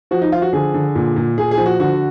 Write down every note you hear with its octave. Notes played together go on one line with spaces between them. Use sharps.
F3 F#4
D#4
F3 F4
F#4
D3 G#4
D3
A#2
A#2
A#2 G#4
G#4
F3
F#4
D3 F#4